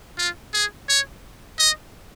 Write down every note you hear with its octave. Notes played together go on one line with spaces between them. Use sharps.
F4
G#4
C#5
D#5